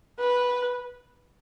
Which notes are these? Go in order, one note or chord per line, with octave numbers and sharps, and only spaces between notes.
B4